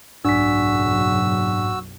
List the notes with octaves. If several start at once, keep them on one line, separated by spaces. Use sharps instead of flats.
F#1 B1 G#2 F#3 D4 F#4 E6 B6